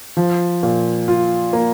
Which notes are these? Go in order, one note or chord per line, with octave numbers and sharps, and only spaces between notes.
F3
A#2
F4
A#3